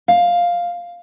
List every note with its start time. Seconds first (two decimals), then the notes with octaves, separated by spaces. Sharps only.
0.08 F5